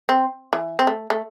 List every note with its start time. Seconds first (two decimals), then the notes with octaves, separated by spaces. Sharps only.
0.09 C4
0.53 E3
0.79 C4
0.87 A3
1.10 A3